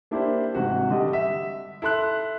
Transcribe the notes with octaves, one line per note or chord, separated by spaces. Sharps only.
A#3 D4 E4 G4 C5
G#1 C3 F#4
D3 G3 G4 D#5
E5
E4 A4 C6 F#6